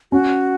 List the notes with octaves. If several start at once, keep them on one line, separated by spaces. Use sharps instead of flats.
C#4 F#4